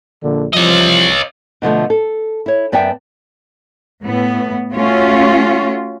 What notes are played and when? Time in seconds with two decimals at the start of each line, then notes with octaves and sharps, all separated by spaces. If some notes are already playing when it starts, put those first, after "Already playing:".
0.22 A#1 A#2 D3
0.53 C2 E3 F3 C#5 D#5
1.62 B2 D3 F3 A3
1.90 A4
2.46 E4 C#5
2.72 F#2 B3 D5 E5 G5 A5
4.03 A2 B3
4.73 A3 C#4 F4 F#4